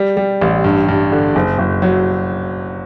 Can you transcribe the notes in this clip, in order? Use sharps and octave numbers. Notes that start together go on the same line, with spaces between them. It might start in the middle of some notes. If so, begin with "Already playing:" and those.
Already playing: G3
G3
A1
G2
G2
D3
F#1
F#1
F#3